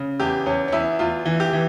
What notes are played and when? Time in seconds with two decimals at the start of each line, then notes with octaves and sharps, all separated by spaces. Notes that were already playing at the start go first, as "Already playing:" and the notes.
Already playing: C#3
0.20 E2 G4
0.46 E2 C#4
0.68 C#4
0.72 E2 E4
0.99 E2 F4
1.26 E3
1.40 G4
1.53 E3